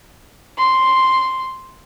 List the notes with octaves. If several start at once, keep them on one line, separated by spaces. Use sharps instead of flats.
C6